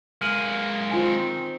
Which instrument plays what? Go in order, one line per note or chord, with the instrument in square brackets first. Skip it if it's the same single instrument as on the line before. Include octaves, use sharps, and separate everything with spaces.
[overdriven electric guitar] G#3 A#3 [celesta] F6 D#7 F#7
[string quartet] D#3 C4 [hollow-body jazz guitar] F4 G#5